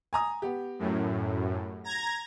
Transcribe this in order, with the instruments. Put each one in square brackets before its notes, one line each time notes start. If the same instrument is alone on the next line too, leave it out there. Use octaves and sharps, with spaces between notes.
[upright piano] G#5 A#5 D#6
B3 G4
[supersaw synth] F#2 A2
A#5 G#6 A#6